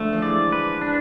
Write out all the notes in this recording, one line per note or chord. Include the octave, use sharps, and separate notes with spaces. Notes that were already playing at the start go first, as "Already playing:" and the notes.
Already playing: D3 F3 A3
F3
E3 G#3 D5
B4
D4